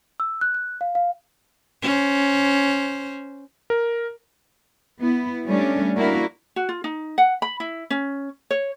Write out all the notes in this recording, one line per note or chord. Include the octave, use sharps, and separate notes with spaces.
E6
F#6
F#6
F5
F5
C#4 C5
A#4
B3 E4
G3 A3 C#4 D4
A#3 D4 E4 F#4 A#4
F#4
F4
D#4
F#5
B5
E4
C#4
C#5